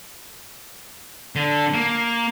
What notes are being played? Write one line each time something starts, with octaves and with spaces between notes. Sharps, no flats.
D3
A#3